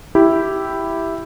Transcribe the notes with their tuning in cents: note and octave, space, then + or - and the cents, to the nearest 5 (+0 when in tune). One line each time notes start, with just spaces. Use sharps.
E4 +0 G4 -5